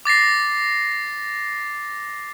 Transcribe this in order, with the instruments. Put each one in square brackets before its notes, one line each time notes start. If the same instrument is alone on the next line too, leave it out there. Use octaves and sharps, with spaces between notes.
[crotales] D6 A6 A#6 C7